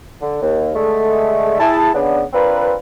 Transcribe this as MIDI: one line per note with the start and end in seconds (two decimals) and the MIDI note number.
0.22 0.40 50
0.42 0.70 39
0.75 1.57 50
0.75 1.57 56
0.75 1.57 57
1.60 1.90 64
1.60 1.90 68
1.60 1.90 81
1.94 2.23 49
1.94 2.23 59
1.94 2.23 62
2.33 2.74 60
2.33 2.74 62
2.33 2.74 65
2.33 2.74 70
2.33 2.74 71